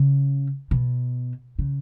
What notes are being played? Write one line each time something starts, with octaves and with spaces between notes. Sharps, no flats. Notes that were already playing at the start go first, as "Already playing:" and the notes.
Already playing: C#3
B2
C#3